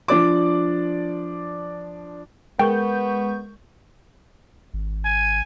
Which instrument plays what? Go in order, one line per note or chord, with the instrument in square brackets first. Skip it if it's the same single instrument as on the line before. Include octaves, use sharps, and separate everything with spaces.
[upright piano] F3 D4 D5 D6
[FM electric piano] G#3 C#6 G6 [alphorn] B3 [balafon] A#4 [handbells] G5
[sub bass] G#1
[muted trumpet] G#5